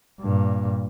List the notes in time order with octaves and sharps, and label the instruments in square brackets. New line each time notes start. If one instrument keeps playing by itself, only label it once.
[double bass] G2 A#2